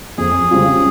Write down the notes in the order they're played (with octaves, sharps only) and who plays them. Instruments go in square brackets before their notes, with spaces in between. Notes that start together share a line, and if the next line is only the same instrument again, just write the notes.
[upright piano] F2 [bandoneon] G#4
[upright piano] C#3 G3 C4 F4